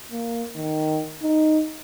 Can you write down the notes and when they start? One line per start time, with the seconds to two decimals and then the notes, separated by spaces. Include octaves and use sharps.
0.11 A#3
0.55 D#3
1.22 D#4